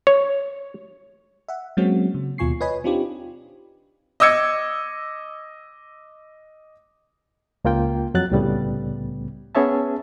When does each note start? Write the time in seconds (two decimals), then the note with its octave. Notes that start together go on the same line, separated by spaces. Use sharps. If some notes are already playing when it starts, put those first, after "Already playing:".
0.07 C#5
1.48 E5 F#5
1.77 F#3 G#3 A#3 C4 C#4 F#4
2.14 C#3
2.38 D#2 B2 F4 G#5 C#6 C7
2.61 B4 C#5 D#5 G#5 B5
2.84 C4 D4 D#4 F4 G4
4.20 D#5 D6 E6 G#6 C#7
7.65 C#2 A#3 F4 G5
8.14 F2 F#3 F#6 A6
8.31 C2 A2 C#3 G3 A3 B3
9.55 B3 C#4 G#4 C#5 E5 A5